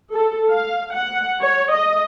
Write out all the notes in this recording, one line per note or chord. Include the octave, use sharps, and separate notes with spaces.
A4
F5
F#5
C#5
D#5